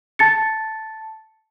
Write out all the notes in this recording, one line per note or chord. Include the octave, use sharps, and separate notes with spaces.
A5 A6 C#7